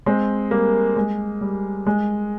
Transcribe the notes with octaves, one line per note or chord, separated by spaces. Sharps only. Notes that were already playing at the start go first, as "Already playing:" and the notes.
G#3 C4
G3 A#3
G#3
G3
G#3